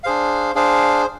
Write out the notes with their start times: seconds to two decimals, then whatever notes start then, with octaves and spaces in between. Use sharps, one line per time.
0.04 D4 G#4 C5 F5
0.55 D4 G#4 C5 F5